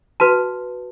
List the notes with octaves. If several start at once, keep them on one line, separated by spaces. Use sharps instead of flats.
F#4 B4 A5